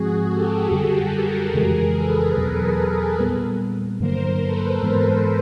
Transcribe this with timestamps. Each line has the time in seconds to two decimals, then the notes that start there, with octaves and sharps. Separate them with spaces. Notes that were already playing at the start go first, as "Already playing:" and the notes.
Already playing: G#2 F3 G#3 C4 F#4 G#4
0.31 G4 A4
0.71 F#2 D3 G3 G4 A4
1.13 G#4 A#4
1.54 F2 C#3 E3 G#3 G#4 A#4
1.94 A4 B4
2.36 E2 B2 F#3
3.19 A#2 G3 B3
4.00 G2 D3 F#3 A#3 A#4 C5
4.41 A4 B4
4.83 G#2 E3 G#3 B3